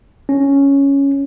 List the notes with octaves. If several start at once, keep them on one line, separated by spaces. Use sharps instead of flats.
C#4